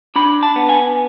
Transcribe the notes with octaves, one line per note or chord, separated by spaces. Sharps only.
D4 B5
A5
B3
G#5